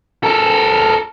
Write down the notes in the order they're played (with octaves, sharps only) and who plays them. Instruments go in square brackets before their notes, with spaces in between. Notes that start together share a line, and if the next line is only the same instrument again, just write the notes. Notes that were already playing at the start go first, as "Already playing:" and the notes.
[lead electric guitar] A4 A#4